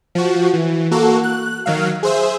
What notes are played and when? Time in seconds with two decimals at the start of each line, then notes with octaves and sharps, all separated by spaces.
0.15 F3 F#4
0.53 E3
0.91 A#3 F#4 A4
1.23 F#6
1.66 D#3 F#3 F5
2.03 G#4 C5 E5